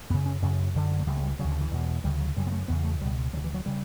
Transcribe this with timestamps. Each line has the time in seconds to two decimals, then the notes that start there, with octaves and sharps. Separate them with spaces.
0.10 F#2 B3
0.14 C#3
0.26 C#4
0.42 F#2 C#3 C#4
0.75 F#2 D3
1.00 A3
1.07 C#2 C#3 G3
1.17 A3
1.23 G3
1.39 C#3 F#3
1.44 D2
1.51 D3
1.61 E3
1.71 E2 B2
2.04 D2 C#3 G3
2.21 F#3
2.36 F#2 C#3 G3
2.47 B3
2.52 A3
2.68 E2 C#3 B3
2.84 A3
3.01 C#2 B2 G3
3.33 D2 F#3
3.37 C#3
3.44 E3
3.54 F#3
3.66 C#3 G3